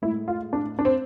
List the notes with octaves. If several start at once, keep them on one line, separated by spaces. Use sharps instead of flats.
A2 G#3 E4
F4
D4
D4
C4